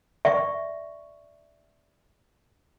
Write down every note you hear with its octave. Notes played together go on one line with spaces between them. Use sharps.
D5 E5 C#6